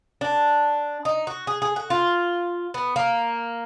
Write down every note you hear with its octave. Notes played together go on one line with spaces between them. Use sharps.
D4
D#4
F#4
G#4
G#4
F#4
F4
B3
A#3